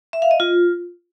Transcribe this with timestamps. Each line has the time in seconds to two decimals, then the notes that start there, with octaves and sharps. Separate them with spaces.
0.13 E5
0.22 F5
0.31 D#5
0.40 F4